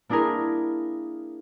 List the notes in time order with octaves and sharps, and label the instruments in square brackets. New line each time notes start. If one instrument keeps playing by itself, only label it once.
[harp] A#3 D4 E4 G#4 A#4